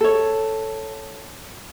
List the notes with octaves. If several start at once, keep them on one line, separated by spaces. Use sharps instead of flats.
A4 C#5